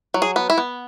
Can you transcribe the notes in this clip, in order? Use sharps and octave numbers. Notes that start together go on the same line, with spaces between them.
F#3
G#4
B3
E4
B3